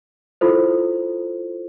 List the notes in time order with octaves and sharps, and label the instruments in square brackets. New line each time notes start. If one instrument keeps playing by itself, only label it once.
[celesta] E4 F4 A4 C5